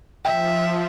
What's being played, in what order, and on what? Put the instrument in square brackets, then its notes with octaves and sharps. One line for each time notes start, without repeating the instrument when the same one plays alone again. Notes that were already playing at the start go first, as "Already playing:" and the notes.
[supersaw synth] F3 [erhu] E5 [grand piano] G5